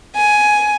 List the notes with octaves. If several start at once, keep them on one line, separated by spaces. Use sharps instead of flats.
G#5